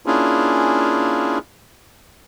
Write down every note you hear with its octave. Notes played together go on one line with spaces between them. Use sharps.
A#3 C#4 D4 E4 F4 G#4